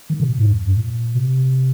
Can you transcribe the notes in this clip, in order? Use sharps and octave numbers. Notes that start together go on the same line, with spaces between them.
D#3
C3
A#2
G#2
F2
G2
A#2
C3